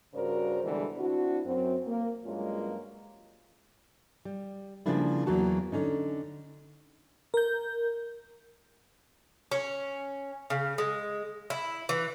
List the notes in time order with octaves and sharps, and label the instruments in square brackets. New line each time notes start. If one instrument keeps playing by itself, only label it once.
[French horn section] G2 C#3 F#4 A#4 C5 D5
E2 B2 D3 E3 G3 G#3
C4 D4 E4 F#4
F#2 C4
A#3
G2 F#3 G#3 A#3 C#4 F4
[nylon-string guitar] G3
C#3 F3 G3 A#3 D4 E4
E2 F#3 A#3 F#4 A5
D3 C#4 D#4
[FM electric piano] A#4 G6
[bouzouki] C#4
C#3
G#3
E4
E3